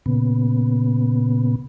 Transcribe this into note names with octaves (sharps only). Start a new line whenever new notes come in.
A#2 C#3 B3